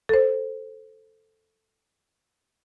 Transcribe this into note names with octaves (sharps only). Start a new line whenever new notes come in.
A4 C5